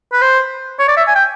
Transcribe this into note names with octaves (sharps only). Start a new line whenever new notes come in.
B4
C5
C#5
D5
E5
G#5
G5